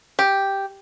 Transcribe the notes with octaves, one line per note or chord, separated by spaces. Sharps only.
G4